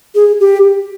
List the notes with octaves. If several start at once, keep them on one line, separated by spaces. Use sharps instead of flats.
G#4
G4